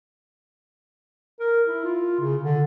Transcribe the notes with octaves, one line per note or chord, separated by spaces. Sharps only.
A#4
E4
F4
C#3
D3